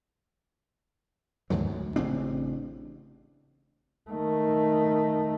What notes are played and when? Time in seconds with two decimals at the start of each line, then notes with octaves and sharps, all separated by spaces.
1.50 D#2 G#2 D3 F#3
1.66 D2
1.96 A1 C#3 C4 D4
4.10 D#3 A3